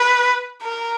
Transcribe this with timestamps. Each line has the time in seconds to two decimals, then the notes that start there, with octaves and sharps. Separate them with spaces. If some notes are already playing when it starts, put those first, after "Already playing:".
Already playing: B4
0.63 A#4